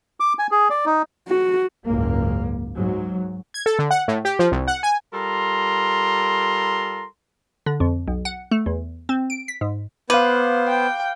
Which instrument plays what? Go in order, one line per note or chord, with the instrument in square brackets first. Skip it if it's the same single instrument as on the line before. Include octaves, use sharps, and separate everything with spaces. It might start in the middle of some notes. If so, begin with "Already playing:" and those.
[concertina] D6
G#5
G#4
D5
D#4
[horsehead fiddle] F#4
[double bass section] F#1 C#2 G#2 A#3
G#2 F#3
[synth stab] G#6
A4
D3
F#5
A2
G4
F3
C2
F#5
G#5
[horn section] G3 F4 A4 A#4 A#5 C6
[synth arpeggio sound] D3
F2
B1
F#5
A3
E2
C4
D7
B6
G#2
[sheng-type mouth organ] B3 C5 [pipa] B4 [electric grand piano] F5 D6
[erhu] G5